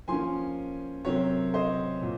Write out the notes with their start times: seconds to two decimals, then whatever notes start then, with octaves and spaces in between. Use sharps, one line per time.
0.08 F3 A#3 C#4 G#5 C6
1.05 C3 F#3 C4 A#4 C#5
1.54 C5 D#5
2.02 A#2